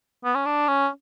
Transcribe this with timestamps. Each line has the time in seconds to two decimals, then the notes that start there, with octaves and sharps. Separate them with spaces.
0.24 B3
0.35 C#4
0.46 D4
0.68 C#4